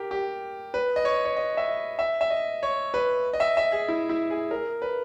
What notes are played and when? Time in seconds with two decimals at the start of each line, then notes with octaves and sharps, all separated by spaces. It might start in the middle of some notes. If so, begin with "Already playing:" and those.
Already playing: G4 A#4
0.11 G4
0.74 B4
0.96 D#5
1.05 C#5
1.25 C#5
1.36 D#5
1.57 E5
1.68 D#5
1.99 E5
2.21 E5
2.30 D#5
2.63 C#5
2.94 B4
3.33 D#5
3.40 E5
3.57 E5
3.72 G#4
3.89 E4
4.09 E4
4.30 G#4
4.51 A#4
4.82 B4